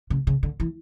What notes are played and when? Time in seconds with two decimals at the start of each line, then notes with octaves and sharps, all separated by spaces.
0.10 C#3
0.27 C#3
0.43 D3
0.60 E3